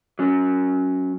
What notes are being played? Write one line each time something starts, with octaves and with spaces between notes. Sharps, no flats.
F#3 C#4